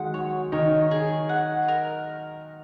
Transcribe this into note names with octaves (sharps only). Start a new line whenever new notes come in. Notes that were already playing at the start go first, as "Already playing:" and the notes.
Already playing: D#3 F#3 G#3 F#5
C#5
D#3 D#4 C#5
G#4
F#5
A#4